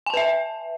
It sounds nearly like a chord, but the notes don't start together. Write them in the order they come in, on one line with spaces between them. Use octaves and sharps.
G#5 A5 B4 E5